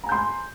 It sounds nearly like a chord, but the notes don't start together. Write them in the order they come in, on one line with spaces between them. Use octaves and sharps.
A#5 G#5 G6 C6